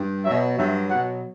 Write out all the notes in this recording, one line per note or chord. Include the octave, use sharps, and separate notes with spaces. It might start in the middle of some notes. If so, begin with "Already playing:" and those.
Already playing: G2
B2 F#3 E5
G2 F#3 E5
B2 F#3 F#5